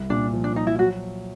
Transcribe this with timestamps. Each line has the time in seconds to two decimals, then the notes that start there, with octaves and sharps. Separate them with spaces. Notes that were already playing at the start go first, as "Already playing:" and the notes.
Already playing: C2
0.10 A#2 D4
0.33 F3
0.44 D4
0.56 F3 D#4
0.67 E4
0.79 F#3 F#4